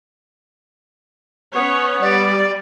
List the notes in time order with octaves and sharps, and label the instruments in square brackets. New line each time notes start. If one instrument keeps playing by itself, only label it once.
[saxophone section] B3 [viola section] C#4 C#5
[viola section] G3 [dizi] D5